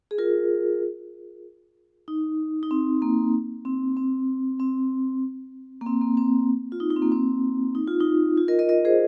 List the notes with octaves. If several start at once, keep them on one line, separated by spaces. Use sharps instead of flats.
G#4
F4 A#4
D#4
D#4
C4
A#3
C4
C4
C4
A#3
C4
A#3
C4
F4
D#4
D#4
C4
A#3
C4
D#4
F4
D#4
F4
A#4 D#5
A#4 D#5
A#4 D#5
G#4 C5